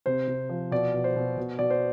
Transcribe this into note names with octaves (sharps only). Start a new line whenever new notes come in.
C3 C5
C3
F3
B2 D5
B2
C5
B2
B2
B2 D5
C5